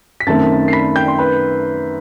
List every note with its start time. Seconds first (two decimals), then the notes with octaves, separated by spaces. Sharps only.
0.20 B6
0.27 F#2 D#3 A3 C4 A5 A6
0.68 C7
0.73 B5 B6
0.96 G5 G6
1.08 C6
1.19 B4 B5